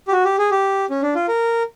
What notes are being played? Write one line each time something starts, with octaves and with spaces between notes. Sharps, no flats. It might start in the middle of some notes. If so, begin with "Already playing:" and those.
G4
F#4
G4
G#4
G4
C#4
D4
F4
A#4